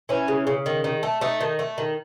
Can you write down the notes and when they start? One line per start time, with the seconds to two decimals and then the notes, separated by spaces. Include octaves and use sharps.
0.09 E3 C#4
0.28 C#3
0.47 C#3
0.66 D#3
0.84 D#3
1.03 A3
1.21 A3 D#4
1.41 D#3
1.59 A3
1.78 D#3